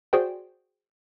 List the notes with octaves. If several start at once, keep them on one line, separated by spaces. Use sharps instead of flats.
F#4 G#4 C5 D5 G5